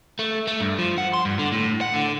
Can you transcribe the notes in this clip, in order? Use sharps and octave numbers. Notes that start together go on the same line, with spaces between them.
A3
A3
G2
F3
F#5
C6
G2
D3
A2
F#5
D3